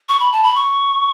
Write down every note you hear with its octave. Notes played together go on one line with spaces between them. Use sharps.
C#6
B5
A5
B5
C#6